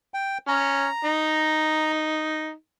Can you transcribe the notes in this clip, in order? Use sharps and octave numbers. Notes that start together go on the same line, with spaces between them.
G5
C#4 A#5
D#4